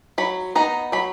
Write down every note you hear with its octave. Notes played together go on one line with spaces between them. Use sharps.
F#3 B5
B3 D#4 A#5
F#3 B5